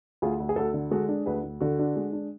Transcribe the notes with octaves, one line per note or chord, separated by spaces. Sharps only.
D2 F4 G#4
D2
G#4
D2 F#4 A4
D3
G#3 F#4 A4
D4
D2 G#4 B4
D2
D3 F#4 A4
D4
G#3
D4